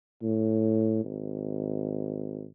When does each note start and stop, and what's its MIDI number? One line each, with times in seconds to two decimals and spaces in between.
0.23 1.00 45
1.04 2.45 32